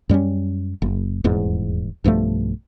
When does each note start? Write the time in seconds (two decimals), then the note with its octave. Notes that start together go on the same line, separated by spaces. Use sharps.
0.09 F#2 G3 C4 C#4
0.82 F#1
1.24 D#1 E2 G#2
2.04 B1 G2 F3 A3